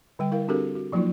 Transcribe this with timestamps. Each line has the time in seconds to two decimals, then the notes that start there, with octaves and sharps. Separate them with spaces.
0.19 D3 G3 G5
0.32 E4 A#4 F5
0.48 C4 D4 F#4 G4 A4 A#4
0.75 F#4
0.92 F3 F#3 A#3 D#4 F4